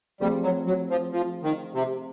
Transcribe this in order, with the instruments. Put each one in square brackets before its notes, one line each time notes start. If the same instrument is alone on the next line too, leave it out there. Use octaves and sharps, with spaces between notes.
[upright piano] F3 A3 C4 F4 G#4 [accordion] G3
[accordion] F#3
F#3
F3
F3
D#3
C3